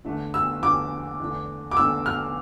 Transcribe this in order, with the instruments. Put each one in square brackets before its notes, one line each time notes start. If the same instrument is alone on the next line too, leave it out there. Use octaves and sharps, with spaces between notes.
[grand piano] E2 D3 A3 D4
[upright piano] E6
[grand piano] E2 D3 A3 D4 [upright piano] D6
[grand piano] E2 D3 A3 D4
[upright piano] D6
[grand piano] E2 D3 A3 D4 [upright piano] E6
[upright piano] F6